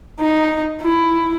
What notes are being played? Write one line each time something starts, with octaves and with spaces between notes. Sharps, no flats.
D#4
E4